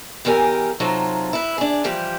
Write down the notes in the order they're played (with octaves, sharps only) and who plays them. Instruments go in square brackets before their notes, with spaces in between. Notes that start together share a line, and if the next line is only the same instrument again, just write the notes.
[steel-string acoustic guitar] E2 E3 G4 A#4 G#5
C3 F#3 D#4 F4 A4
E4 B4
D4 G#4
E3 F3 G3 G4